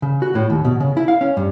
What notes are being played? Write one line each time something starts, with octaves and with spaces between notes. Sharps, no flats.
C#3
F#4
A2
D#2
B2
C#3
E4
F5
C#4
G2